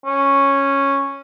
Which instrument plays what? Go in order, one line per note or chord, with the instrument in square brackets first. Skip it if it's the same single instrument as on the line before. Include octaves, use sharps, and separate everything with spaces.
[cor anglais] C#4